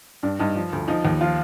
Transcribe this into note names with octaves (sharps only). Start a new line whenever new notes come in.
G2 D4
G2 D#4
F3
D2
F3 D#4
D#2
F3 F4